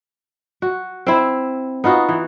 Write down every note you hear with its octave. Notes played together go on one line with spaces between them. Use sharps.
F#4
C4 E4
B3 D#4 F4 F#4
E3